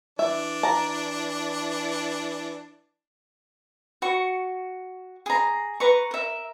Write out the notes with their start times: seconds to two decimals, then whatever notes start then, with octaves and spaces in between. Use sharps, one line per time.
0.19 E3 D4 E5
0.63 A5 A#5
4.02 F#4 C#6
5.26 G#4 A#5
5.80 B4 A#5 C#6
6.11 A#4 E5